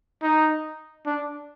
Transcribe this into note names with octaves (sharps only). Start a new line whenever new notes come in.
D#4
D4